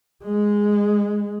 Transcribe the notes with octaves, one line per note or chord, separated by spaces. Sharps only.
G#3